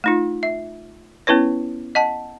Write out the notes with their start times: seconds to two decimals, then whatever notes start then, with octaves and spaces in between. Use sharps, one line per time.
0.04 A3 D#4 F4
0.43 E5
1.27 B3 C#4 E4 B4 C#5
1.95 D#5 F#5 A5